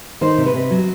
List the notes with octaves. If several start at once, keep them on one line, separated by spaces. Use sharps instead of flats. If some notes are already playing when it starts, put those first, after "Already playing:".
D#3 C5
C3
B4
C3
F#3